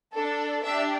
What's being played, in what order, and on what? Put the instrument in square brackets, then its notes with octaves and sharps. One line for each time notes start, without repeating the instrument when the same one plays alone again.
[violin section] D4 A4
D4 G4 E5